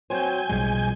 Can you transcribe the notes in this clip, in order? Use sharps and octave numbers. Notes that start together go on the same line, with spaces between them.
F#3 C4 C5 G#5 G6
B1 F3 G3 G#3